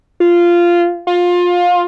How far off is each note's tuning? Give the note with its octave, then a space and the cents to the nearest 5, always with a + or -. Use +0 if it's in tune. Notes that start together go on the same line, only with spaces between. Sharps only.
F4 -10
F4 +20